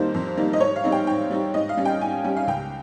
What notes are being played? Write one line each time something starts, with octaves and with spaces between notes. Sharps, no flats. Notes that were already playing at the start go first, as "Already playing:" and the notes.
Already playing: F2 D#3 G3 A#3 D#4 C5
F2
D#3 G3 A#3 D#4
D#5
G#2 C#5
F5
G3 C4 D#4
G5
G#2 G5
G3 C4 D#4
G#2 D#5
F5
G3 C#4
G5
G#2 G#5
G3 C#4
F5
C#2 G5